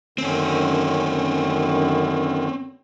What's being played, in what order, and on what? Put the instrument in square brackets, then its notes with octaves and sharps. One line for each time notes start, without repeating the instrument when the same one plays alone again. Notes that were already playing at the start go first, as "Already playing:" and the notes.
[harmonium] F#2 D3 D#3 [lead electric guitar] C4 C#4